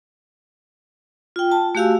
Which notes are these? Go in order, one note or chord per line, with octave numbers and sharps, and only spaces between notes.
F4 G5
A5
A3 F#4 G4 F5 G#5 E6